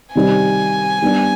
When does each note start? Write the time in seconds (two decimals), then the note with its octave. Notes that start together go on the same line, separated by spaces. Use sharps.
0.15 C3 D#3 G3 C4 D#4 G#5
1.02 G3 B3 D4